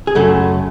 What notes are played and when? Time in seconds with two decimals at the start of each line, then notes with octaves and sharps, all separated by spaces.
0.07 G#4
0.15 F#2 C#3 F#3 A3 A4